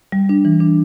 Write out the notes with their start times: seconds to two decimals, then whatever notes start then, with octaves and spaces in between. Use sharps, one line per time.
0.12 G3
0.29 D4
0.45 E3
0.60 D4